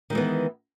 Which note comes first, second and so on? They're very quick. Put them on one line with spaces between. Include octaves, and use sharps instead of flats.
D#3 G#3 E3 B3